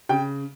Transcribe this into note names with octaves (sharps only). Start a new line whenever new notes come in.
C#3 G5